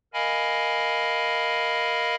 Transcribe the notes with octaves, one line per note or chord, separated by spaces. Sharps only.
A#4 D#5 F5 G#5 B5